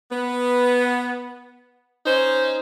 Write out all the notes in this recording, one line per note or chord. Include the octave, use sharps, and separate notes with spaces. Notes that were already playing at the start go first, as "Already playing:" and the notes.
B3
C#4 D#4 C5